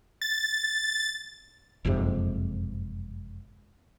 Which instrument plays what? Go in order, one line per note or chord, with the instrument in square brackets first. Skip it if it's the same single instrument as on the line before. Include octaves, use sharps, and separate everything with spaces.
[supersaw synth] A6
[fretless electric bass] F#1 F2 G#2 C3